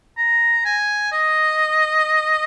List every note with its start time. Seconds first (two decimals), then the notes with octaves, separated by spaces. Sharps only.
0.17 A#5
0.65 G#5
1.12 D#5